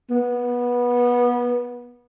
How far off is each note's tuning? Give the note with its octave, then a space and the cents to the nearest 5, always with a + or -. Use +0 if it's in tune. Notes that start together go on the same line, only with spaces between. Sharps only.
B3 -20